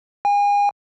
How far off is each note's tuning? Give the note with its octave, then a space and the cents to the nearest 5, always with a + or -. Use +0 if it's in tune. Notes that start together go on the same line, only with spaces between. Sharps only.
G#5 -35